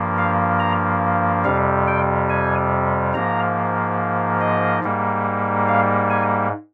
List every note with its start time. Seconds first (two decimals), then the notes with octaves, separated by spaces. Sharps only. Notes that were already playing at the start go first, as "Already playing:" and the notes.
Already playing: G2 F3 A#3
0.18 F5
0.60 A#5
1.44 F2 C3 G3 F5
1.87 G5
2.29 G#5
3.14 G#2 F3 A#3 A#5
4.41 D#5
4.83 G#2 G3 A#3
5.68 F5
6.10 G#5